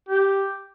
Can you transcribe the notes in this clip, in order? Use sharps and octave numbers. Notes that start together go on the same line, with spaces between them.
G4